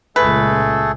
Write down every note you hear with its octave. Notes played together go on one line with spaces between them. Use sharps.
C#2 A#2 A3 G#4 A4 B4